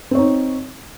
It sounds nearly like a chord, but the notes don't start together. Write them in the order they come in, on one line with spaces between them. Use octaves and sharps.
C4 C#5 D#4